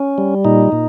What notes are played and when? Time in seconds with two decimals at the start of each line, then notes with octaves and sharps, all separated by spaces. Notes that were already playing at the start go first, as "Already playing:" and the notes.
Already playing: C#4
0.18 G3
0.45 A#2 D#4
0.72 A#2